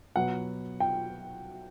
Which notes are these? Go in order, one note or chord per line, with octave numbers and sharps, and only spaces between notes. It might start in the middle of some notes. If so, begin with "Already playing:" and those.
B2 F#3 B3 F#5
G5